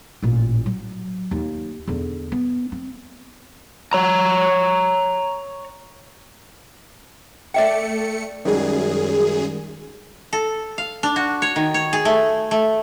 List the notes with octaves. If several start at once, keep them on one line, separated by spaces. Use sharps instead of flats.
A1 A#2
F#3
D#2
E2 D3
B3
C4
C#5 A#5
A3 D5 E5 G5 C#7
F#2 D#3 G3 G#3 G#4
A4
F5
D4
F#4
C#5
D#3
C#5
G#4
A3
A3